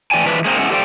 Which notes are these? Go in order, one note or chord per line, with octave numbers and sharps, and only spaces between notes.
A2 E3 G4 D5 G5 G#5
E3 F3 G#3 D4 B4
G#3 A#3 C4 D#4
G#3 C#4 E4 F#4 G#4 F#5
G4 A4 C5 D5 F5 G5